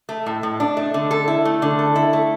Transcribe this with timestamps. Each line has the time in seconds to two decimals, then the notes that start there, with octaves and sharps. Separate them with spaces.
0.09 A3
0.26 A2
0.43 A2
0.60 D4
0.77 A3
0.94 D3
1.11 A4
1.28 E4
1.45 A3
1.62 D3
1.79 A4
1.96 E4
2.13 A3